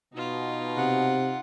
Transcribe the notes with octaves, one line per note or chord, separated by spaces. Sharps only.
B2 D#4 F4
C3 F#5